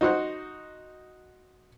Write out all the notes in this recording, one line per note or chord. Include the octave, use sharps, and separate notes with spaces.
D#4 F#4 C5 F#5